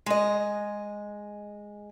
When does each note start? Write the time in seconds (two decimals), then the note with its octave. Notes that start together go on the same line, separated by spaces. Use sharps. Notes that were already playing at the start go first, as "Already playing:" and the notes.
0.06 G#3 D#5